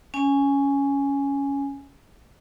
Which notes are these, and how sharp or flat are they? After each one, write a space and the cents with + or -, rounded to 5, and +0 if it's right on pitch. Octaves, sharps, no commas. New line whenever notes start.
C#4 +10 G#5 +0